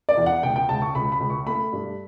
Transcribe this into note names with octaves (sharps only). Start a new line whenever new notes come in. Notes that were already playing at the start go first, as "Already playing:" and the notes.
D5
E2
F#5
C#2 G5
G5
C#2 A5
C#6
C#2 B5
B5
C#2
C#6
A3 B5
G2